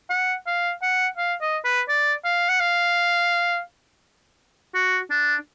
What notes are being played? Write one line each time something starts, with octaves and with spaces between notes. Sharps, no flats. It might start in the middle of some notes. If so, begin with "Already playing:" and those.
F#5
F5
F#5
F5
D#5
B4
D5
F5
F#5
F5
F#4
D4